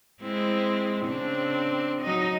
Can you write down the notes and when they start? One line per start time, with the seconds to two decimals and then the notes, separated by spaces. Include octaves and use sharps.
0.22 G#3 C4 E4
1.06 C#3 C4 D4
2.02 F#3 D#4 D#5